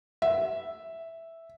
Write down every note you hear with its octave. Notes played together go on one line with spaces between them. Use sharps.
E5